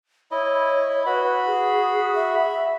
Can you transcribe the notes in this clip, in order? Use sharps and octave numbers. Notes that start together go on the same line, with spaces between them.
E4 C#5 D#5
F#4 B4 B5
G#4
E5